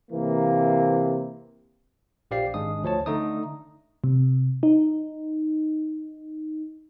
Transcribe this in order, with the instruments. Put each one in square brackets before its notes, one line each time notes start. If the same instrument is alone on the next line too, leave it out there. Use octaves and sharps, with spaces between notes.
[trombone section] C3 E3 A#3
[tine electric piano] A#1 F3 G4 D5 F5 C7
G#1 G#3 D4 D#6
D2 F3 C#5 A5
D3 A3 D#4 D#6
[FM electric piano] C3
D#4